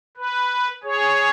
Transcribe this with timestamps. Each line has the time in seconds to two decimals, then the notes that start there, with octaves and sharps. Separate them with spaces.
0.17 B4
0.84 G#4 C#5